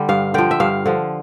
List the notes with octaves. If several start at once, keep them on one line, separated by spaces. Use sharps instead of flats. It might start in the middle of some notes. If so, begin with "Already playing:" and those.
Already playing: D3 G3
G2 F5
D3 F3 G5
E5
G2 F5
D3 F3